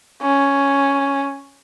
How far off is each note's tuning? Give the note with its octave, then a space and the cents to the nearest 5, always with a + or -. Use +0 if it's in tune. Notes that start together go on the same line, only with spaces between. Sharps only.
C#4 +0